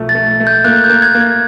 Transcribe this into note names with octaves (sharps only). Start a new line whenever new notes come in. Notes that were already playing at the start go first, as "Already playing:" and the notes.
Already playing: B1 F3 A3
A6
A3
A3
G6
A#3 F#6
G6
A#3
G#6
A#3
G#6